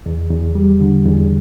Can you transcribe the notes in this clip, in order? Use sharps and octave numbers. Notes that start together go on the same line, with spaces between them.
E2
E2
G3
D3
E2